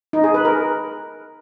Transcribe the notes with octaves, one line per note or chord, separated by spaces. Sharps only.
D#4
G#4
B4
A#4